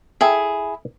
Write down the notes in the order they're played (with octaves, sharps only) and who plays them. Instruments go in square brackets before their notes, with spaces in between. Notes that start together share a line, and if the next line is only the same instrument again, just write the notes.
[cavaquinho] E4 G#4 [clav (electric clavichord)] A4 E5 G5